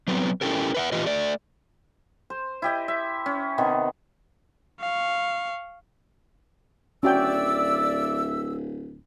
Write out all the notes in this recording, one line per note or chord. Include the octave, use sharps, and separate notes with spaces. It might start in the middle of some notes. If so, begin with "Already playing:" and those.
F#3 B3 C4
C#4 E4 G4 A4 A#4
B4 E5 F#5
E3 F4 G4 B4 D#5
A3 D5
C5
E4 G4 D#5
E5
C#4
C3 D#3 B3
F5 C#6
D1 C#4 F#4 D5 E5 G5 E6